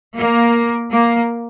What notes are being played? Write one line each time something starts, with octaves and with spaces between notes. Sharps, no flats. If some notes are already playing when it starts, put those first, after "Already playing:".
A#3
A#3